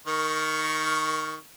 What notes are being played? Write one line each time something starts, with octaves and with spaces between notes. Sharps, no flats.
D#3 A#4 C#6